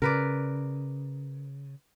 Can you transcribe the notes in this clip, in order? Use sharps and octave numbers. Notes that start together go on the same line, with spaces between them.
C#3 A#4 B4 D5